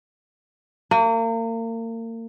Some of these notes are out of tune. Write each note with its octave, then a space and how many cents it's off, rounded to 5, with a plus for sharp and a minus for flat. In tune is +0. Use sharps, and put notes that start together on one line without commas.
A#3 -35